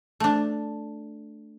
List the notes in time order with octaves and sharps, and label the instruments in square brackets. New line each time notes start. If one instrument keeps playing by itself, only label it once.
[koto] A3 D4